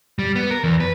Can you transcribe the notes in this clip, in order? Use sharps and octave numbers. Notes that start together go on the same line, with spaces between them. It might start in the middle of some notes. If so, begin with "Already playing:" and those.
G3
B3
A#4
E2
B4